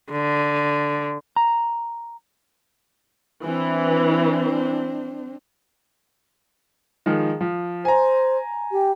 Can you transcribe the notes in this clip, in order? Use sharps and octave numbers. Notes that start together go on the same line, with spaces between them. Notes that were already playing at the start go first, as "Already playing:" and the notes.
D3
A#5
E3 C4 D4
D#3 F3 G#3
F3
C5 G#5 A#5
G4